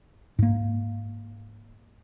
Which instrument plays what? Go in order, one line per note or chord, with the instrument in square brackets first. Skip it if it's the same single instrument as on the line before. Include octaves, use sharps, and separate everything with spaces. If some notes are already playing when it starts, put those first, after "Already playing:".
[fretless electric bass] G#2 A#3